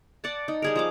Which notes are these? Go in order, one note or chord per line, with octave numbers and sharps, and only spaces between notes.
D5 F#5 A5
D#4
G3 G#4 A#4
F3 A#5 D6